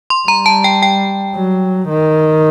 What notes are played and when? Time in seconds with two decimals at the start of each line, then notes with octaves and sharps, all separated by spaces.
0.10 C6
0.28 G3 A#5
0.46 A5
0.64 G5
0.83 G5
1.35 F#3
1.89 D#3